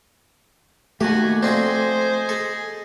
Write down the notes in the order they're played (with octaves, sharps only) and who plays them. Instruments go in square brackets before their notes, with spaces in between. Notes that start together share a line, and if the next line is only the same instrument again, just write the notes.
[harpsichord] D#2 G4 [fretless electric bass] A3 [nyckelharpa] F#4 G#5
[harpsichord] F3 C4 D4 [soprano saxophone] C5 [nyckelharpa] D#5 G#5
[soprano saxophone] G#4 [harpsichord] A4